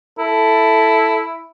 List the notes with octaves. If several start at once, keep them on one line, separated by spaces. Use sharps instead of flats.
E4 A4